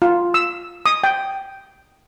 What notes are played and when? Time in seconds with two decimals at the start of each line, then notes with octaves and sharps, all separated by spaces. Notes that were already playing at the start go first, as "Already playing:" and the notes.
0.02 F4
0.34 E6
0.86 D#6
1.04 G5